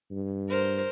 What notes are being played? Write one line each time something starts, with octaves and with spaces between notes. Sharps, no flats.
G2
A#4 C5